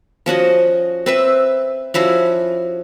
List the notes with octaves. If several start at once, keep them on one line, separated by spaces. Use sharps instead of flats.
F3 C#4 F#4 D#5
C4 B4 E5
F3 C#4 E4 F#4